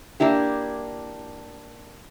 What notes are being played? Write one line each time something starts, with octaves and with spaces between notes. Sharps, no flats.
A#3 D4 E4 G4